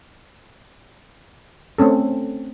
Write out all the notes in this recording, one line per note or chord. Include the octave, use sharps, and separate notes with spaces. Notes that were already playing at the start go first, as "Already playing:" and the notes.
A3 C4 C#4 A4